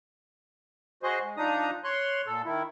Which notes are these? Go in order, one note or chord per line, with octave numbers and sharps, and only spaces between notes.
F#4 G#4 C5 D#5
G#3
F3 D4 D#4 A#5 D#6
C#5 C6 F#6
A#2 A4
D#3 E4